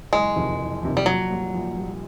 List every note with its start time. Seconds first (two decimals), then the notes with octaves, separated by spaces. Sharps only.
0.13 F#1 G#3
0.36 F2 C3 D#3
0.59 F#1
0.82 F2 C3 D#3
0.97 G3
1.06 A#1 F#3
1.30 A#2 G3
1.54 A#1
1.77 A#2 G3